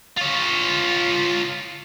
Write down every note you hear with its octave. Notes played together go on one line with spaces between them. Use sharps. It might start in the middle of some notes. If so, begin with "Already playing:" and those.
F4 C#5